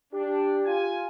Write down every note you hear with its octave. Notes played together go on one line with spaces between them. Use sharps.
D4 G4
F4 G#5